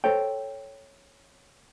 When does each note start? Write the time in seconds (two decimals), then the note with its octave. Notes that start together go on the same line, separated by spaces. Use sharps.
0.04 A4 C5 C#5 G5